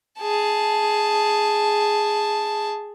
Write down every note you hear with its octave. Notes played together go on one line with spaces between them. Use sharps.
G#4 A5